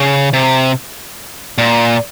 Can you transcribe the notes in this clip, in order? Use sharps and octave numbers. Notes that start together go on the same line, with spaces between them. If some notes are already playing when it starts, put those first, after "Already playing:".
Already playing: C#3
C3
A#2